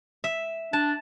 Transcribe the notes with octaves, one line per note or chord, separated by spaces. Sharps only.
E5
D4 A5